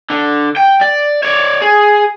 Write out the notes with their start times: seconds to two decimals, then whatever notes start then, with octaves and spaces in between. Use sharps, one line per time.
0.10 D3
0.56 G5
0.81 D5
1.23 C#5 D5
1.61 G#4